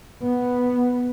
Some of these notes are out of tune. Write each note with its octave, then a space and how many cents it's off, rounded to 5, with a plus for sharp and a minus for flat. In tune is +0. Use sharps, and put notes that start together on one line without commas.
B3 +0